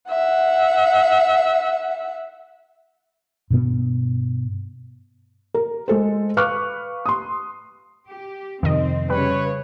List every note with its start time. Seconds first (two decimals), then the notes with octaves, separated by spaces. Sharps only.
0.10 E5 F#5
3.50 G2 B2 B3
5.54 A#4
5.88 G#3 A4 C5
6.37 B4 F5 C#6 D6 F6 F#6
7.06 C6 D#6
8.08 G4
8.63 F2 C3 D#3 C4 D#5
9.10 C#3 G3 B4 C#5